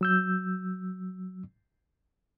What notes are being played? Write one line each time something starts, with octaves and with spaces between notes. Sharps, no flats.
F#3 E6 G6